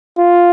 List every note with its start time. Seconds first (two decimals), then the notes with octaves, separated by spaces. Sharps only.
0.18 F4